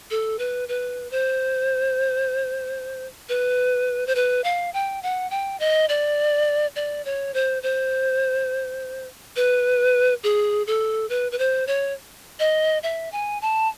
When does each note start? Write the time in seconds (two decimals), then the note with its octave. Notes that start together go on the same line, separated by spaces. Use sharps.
0.11 A4
0.39 B4
0.69 B4
1.11 C5
3.29 B4
4.07 C5
4.15 B4
4.44 F5
4.74 G5
5.03 F#5
5.31 G5
5.60 D#5
5.89 D5
6.76 D5
7.05 C#5
7.34 C5
7.63 C5
9.36 B4
10.24 G#4
10.67 A4
11.09 B4
11.32 B4
11.39 C5
11.67 C#5
12.40 D#5
12.83 E5
13.12 G#5
13.42 A5